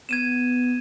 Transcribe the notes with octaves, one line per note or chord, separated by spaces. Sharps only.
B3 G#6 D#7 E7